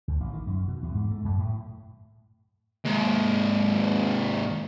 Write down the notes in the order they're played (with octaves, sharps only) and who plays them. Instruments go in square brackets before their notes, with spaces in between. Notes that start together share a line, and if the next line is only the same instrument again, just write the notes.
[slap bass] D2
A1
D#3
F#2
B2
E2
G#2
A3
F#2
A2
[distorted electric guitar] D#2 G#2